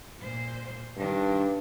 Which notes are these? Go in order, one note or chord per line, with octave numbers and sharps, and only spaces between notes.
A#2 C5
G2 D#3 D4